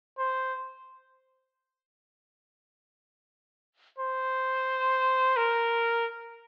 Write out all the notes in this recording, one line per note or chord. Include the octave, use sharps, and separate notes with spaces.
C5
C5
A#4